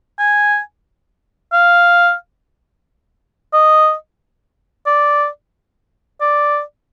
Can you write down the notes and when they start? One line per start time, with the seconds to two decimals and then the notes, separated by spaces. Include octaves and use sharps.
0.19 G#5
1.53 F5
3.53 D#5
4.86 D5
6.21 D5